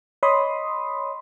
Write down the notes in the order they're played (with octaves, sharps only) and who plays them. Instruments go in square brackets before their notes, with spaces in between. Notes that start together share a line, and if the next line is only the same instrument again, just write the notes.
[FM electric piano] C#5 D#5 B5 C6 D#6